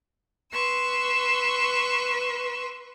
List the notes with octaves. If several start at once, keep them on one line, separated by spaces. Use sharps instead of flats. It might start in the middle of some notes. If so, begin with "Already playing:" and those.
B4 C6 C#6 E6